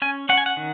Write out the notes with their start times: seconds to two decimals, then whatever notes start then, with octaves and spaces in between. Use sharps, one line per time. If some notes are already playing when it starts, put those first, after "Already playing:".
0.02 C#4 G#5
0.29 C#4 F#5
0.37 G#5
0.46 F#5
0.57 D#3